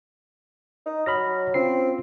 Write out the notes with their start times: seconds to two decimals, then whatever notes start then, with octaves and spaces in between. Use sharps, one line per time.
0.86 D#4
1.06 F#3 B5 F6 A#6
1.54 C4 C#4 F4 C7